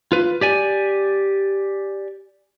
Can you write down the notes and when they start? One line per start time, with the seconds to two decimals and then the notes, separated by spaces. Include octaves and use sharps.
0.12 F4 B4
0.41 G4 D5 G#5